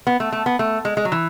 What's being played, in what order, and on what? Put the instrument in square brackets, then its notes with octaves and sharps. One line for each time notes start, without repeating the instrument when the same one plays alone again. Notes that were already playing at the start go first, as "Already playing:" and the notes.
[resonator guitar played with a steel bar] B3
A3
A3
B3
A3
G#3
G#3
F#3
E3